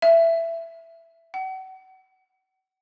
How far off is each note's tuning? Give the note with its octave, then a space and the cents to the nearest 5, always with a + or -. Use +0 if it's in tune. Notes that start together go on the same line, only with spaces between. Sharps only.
E5 +15
F#5 +40